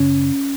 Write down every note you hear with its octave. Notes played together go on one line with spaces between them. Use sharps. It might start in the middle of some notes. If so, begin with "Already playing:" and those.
Already playing: F#2 C#3 C#4